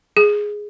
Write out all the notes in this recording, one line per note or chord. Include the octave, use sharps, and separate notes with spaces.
G#4